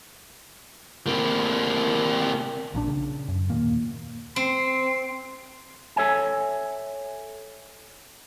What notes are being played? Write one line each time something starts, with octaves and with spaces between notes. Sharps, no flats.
C3 A#3
A#1 A#2 D#3 D4
C#3
F#2
D#2 A#2 D#3 A#3
C4 C6
A4 C#5 E5 G#5